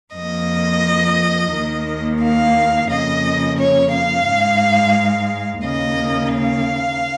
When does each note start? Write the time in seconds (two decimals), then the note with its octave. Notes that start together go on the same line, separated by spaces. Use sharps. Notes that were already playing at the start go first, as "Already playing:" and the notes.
0.14 F2 F3 A#3 D#5
1.52 D#2 D#3 A#3
2.21 F5
2.89 F2 C#3 A#3 D#5
3.57 C#5
3.91 F5
4.26 G#2 G#3
5.63 D#2 C#3 A#3 D#5
6.32 F5